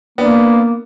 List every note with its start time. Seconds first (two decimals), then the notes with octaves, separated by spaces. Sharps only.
0.18 A#3 B3 D4